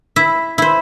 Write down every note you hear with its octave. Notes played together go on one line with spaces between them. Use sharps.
E4 E5
E4 C5